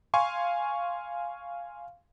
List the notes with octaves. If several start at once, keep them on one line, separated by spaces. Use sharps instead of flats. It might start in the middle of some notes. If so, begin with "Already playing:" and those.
F5 G#5 C6 C#6